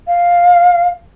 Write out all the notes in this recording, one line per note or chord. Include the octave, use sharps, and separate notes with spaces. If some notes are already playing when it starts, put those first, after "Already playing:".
F5